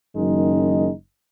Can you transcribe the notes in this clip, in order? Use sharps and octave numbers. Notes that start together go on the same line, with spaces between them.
F#1 F#2 D#3 G#3 D#4